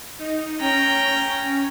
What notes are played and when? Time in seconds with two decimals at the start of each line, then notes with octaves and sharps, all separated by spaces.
0.19 D#4
0.60 C#4 G5 A#5